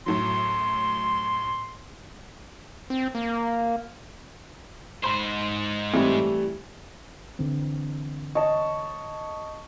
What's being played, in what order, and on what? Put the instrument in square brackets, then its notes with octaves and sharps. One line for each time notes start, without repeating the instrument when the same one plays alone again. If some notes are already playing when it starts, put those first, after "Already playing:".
[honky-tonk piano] F#2 A2 F#3 [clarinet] C6
[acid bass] C4
A#3
[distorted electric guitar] G#2 C5 [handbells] B5 C6
[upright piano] E3 G3 A3 [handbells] C4 E4
[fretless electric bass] D3 E3 C4
[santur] C#5 A5 [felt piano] D#5